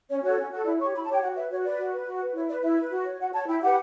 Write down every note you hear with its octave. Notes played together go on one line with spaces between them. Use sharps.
C#4 C#5
F#4 A4 C#5
C#4
F#4 A4
E4 D5
G4 C#5 C#6
E4 B5
A5
G4 C#5 G5
F#4 F#5
B4 E5
F#4 C#5
B4 D5
F#4
B4
F#4
B4
E4 C#5
B4 D5
E4 E5
B4
F#4
C#5
F#4 F#5
C#5 A5
E4 G5
G4 B4 F#5